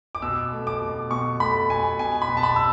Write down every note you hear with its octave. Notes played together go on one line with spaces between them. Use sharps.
D6
B2 E6
A3
D6
B2
B2 C#6
A3 B5
B2 G#5
B2 G#5
B5
B2
A5
B5
E6